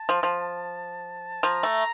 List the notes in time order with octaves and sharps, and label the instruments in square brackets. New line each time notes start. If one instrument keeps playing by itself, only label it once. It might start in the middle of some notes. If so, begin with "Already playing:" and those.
Already playing: [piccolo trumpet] A5
[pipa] F3
F3
[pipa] F3 [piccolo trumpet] A#5
[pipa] A3